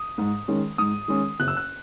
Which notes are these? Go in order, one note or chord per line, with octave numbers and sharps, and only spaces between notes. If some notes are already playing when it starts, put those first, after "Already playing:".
Already playing: D#6
G#2
D#3 G#3 C#4
G#2 D#6
D#3 G#3 C#4
F#1 F#6
E6
F#6